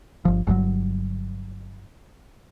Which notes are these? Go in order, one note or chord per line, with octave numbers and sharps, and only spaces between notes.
G1 F3
G1 G2 D3 F#3